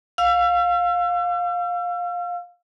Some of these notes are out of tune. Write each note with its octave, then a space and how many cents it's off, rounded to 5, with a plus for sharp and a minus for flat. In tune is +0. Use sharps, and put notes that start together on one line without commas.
F5 +20 E6 +40